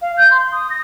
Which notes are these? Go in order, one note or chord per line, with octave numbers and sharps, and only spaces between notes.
F5
G6
C6
D#6
A#6